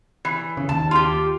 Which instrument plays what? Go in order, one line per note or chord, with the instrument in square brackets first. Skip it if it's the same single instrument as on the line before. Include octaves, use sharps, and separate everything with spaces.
[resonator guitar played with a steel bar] E3
[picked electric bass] C#3
[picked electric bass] D#2 [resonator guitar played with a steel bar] A5
[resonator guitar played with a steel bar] F4 G4